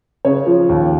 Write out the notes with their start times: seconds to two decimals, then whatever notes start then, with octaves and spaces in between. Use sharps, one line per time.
0.25 C#3 C#5
0.46 F3
0.69 D#2